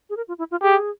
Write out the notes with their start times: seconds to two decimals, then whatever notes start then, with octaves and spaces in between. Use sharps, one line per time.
0.10 G#4
0.17 A#4
0.28 F4
0.38 E4
0.51 F4
0.62 G4 G#4